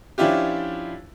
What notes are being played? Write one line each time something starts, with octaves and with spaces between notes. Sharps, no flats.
F3 C#4 D4 E4 F4 G4